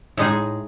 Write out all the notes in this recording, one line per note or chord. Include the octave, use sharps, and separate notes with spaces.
A2 G#3 D#4 G#4